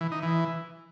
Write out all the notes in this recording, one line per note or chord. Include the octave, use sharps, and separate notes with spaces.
E3
D#4
E3